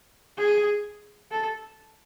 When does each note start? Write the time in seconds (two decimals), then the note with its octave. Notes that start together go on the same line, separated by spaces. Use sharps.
0.37 G#4
1.31 A4